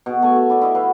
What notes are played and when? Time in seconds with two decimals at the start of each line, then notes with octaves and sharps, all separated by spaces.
0.06 B2 G#4
0.22 A3 G#5
0.35 F#4 E5
0.49 E4 D5 E5
0.61 E4 D#5 E5
0.75 F#4 B4 F5